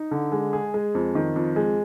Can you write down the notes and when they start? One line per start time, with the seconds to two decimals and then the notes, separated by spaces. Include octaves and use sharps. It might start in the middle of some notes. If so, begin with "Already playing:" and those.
Already playing: D#4
0.11 D3
0.32 G#3
0.53 G#4
0.74 G#3
0.95 F2
1.15 D#3
1.36 F2
1.56 G#3